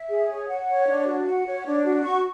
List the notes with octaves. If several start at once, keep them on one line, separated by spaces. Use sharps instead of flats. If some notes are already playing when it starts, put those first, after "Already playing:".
Already playing: E5
G#4
C#5
F#5
C#5
D4
F#4
F#5
C#5
D4
F#4
C#6